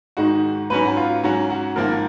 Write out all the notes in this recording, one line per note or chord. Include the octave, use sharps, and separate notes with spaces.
G#2 D#3 G#3 D#4 F#4
G#2 F#3 C#4 B4
F#4
F4
G#2 F#3 C#4 F#4
F#4
G#1 G#2 F3 A#3 A#4